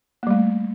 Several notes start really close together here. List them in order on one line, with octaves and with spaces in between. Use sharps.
A#3 G3 A3